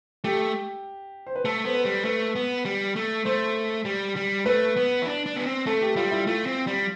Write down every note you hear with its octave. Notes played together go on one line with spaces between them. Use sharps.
A3 G4
C5
B4
A3 A4
B3 C5
B4
G3
A3 B4
B3
G3
A3
A3 C5
G3
G3
A3 B4
B3
E4
D4
D4
B3
C4
A3 A4
G4
G3 F4
E4
A3 F4
C4
G3